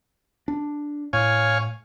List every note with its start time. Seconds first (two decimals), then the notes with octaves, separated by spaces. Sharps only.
0.48 D4
1.13 A2 C#5 F5 G#5